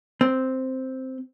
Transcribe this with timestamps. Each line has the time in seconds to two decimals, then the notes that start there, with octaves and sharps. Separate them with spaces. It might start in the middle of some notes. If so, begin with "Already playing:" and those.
0.21 C4